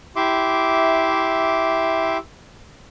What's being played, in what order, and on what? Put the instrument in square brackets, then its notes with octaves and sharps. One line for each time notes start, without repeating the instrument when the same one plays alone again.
[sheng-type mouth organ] E4 G4 E5 C6 D6